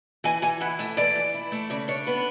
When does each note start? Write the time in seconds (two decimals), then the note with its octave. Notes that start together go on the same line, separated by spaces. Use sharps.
0.24 E3 G#5
0.42 E3 G#5
0.61 E4 F#5
0.79 A3 E5
0.97 E3 D5
1.15 E3
1.34 E4
1.52 A3
1.70 C#3 D5
1.88 D4 C#5
2.07 B3 B4